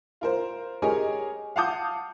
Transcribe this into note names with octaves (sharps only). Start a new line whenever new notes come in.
F4 A#4 C5
G4 G#4 A#4 C#5 D#5 G#5
F5 F#5 A5 D6 D#6 G6